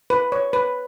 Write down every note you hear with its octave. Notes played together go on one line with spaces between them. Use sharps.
B4
C#5
B4